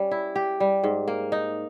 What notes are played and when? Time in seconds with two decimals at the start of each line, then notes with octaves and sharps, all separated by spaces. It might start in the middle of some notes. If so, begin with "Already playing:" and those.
Already playing: G3 C#4
0.11 E4
0.36 G4
0.60 G3
0.84 G#2
1.08 A#3
1.32 D#4